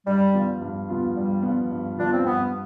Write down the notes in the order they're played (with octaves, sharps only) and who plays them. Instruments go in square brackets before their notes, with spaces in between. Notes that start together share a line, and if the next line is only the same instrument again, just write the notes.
[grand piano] G2 [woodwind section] G3
[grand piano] F3 B3 F4
G2
F3 B3 F4
[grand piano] G2 [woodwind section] G3
[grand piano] F3 B3 F4
G2
[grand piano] F3 B3 F4 [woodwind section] D4
[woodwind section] C4
[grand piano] G2 [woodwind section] B3